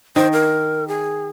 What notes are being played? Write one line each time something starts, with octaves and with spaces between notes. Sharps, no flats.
D#3 C5
A#4
G#4